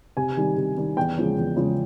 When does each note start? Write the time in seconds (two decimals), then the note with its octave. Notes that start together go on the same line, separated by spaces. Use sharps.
0.17 C3 G#5
0.37 D#3 G3
0.57 C3
0.77 D#3 G3
0.97 E2 G5
1.18 C#3 F3 G#3
1.37 E2
1.56 C#3 F3 G#3